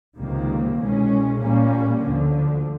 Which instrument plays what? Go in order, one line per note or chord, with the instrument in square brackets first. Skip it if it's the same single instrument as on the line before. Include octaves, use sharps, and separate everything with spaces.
[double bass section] C#2 C3 D#3 G3 A#3
C2 B2 G#3 C#4
A#2 G3 A#3 C#4
D2 D3 F3